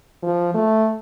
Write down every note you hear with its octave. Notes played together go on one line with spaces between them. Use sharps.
F3
A3